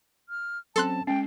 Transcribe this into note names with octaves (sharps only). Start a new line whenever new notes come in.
F6
F#3 C4 C#4 A4 A5 C6 F#6
G#3 C#4 G5 C7